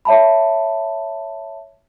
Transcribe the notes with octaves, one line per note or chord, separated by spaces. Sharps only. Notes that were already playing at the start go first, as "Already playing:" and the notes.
C#5 E5 A5 B5